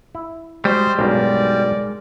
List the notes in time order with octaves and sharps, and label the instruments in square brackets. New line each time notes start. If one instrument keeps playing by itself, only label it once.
[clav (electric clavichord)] E4
[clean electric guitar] G3 [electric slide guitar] G#3 F#4 G#4 [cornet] C5
[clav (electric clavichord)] B1 G2 C#3 [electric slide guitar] G#3 A#4 [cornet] D5